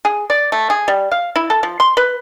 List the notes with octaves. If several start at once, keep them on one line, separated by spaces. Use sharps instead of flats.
G#4
D5
A3
G#4
G3
F5
E4
A4
F3
C6
B4